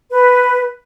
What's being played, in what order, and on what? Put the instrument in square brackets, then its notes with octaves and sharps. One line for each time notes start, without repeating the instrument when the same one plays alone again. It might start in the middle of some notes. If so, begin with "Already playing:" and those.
[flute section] B4